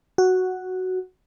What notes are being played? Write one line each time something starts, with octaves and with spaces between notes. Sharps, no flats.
F#4